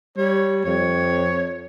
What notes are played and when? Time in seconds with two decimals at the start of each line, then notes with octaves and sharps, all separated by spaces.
0.18 G3 C#5
0.65 F2 C#5